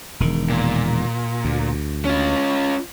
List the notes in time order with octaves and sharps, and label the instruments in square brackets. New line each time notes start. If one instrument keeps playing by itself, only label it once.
[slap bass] E1 D#3
[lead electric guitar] A#2
[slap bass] D2
[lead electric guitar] C#4 F4